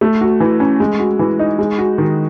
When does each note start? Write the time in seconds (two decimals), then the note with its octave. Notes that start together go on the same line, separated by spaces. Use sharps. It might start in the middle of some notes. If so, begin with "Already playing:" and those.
0.01 A3
0.21 F#4
0.40 E3
0.60 C#4
0.80 G#3
1.00 F#4
1.19 E3
1.39 D#4
1.59 G#3
1.78 F#4
1.98 D#3